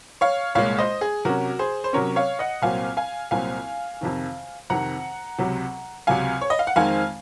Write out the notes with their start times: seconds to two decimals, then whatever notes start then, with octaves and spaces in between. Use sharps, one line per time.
0.21 C#5 F5
0.55 C2 A#2 G#3 C#5 F5
0.79 C5 D#5
1.01 G#4
1.25 C3 F#3 C#4 F#4 A#4
1.59 G#4 C5
1.84 C5
1.93 C3 F#3 C#4 A#4 C#5
2.16 C#5 F5
2.39 D#5 F#5
2.62 C2 A#2 F#3 C4 F5 G#5
2.97 F5 G#5
3.31 C2 A#2 F#3 C4 F5 G#5
4.01 F2 C3 D#3
4.70 F2 C3 D#3 F#5 A#5
5.38 C#2 C3 F#3
6.07 C#2 C3 F#3 F5 G#5
6.41 C#5
6.50 D#5
6.59 F5
6.67 F#5
6.76 F2 D#3 G#3 C4 D#4 F5 G#5